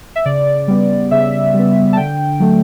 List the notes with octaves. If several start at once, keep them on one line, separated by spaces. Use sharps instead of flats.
E5
C#3 D5
G3 B3
C#3 E5
G3 B3
A5
D3 G5
F#3 A3